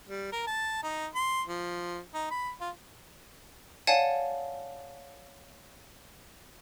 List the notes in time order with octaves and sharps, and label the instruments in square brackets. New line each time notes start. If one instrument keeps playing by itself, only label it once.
[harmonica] G3
A#4
A5
D#4
C6
F3
D#4
B5
F4
[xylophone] C#5 D5 F5 F#5 G#5 A5